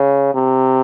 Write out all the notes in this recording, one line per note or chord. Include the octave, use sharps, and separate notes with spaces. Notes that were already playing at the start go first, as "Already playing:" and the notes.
Already playing: C#3
C3